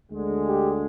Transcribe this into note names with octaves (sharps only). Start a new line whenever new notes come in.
D2 D3 G#3
G4